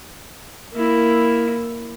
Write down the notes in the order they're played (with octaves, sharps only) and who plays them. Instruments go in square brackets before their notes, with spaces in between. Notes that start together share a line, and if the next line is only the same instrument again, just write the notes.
[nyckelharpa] A#3 E4